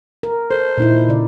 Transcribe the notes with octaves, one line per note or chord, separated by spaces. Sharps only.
A#4
A4 C5
A#2 D#4 E4
C#3 D5